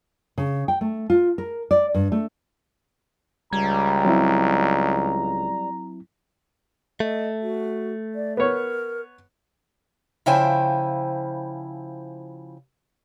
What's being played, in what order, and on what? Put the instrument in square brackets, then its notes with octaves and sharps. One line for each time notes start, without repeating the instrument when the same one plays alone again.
[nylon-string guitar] C#3
G5
A3
F4
A#4
D5
G2
A3
[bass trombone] C#2 [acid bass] G3 [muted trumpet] A#5 [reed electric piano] G#6
[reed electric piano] F#3 C4 E4
[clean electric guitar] A3 [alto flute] D#5
[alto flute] F#4
D5
[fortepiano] B3 C#5 [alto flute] A#4
[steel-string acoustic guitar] C#3 F3 E4 C5 G5 G#5